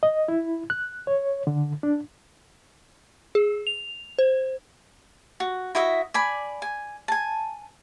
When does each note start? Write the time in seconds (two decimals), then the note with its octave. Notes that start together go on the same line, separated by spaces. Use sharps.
0.03 D#5
0.28 E4
0.70 F#6
1.07 C#5
1.47 D3
1.83 D4
3.35 G#4
3.67 F7
4.19 C5
5.40 F#4
5.75 E4 F#4 D#5 E5
6.14 D5 G#5 B5
6.62 G#5
7.08 G#5 A5